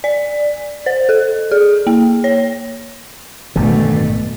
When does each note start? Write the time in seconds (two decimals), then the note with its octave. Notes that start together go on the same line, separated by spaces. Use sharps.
0.04 D5
0.86 C5
1.09 A4
1.51 G#4
1.87 A#3
2.24 C#5
3.56 G#1 F#2 B2 D3 A3